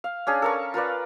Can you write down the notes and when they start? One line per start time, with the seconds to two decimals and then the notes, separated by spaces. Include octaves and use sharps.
0.04 F5
0.27 C#4 D4 G#4
0.42 A4 A#4 C#6
0.74 F4 A#4 B4 D5